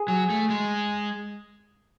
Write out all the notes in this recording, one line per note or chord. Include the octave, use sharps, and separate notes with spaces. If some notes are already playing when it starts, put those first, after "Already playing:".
Already playing: G#4
F#3
A3
G#3